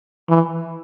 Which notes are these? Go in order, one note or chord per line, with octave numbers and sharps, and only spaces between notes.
E3